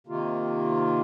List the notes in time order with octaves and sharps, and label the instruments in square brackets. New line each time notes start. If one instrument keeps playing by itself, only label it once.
[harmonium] C3 D#3 A#3 F4